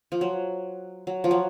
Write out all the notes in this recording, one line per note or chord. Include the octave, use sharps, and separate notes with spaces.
F3
F#3
F#3
F3
F#3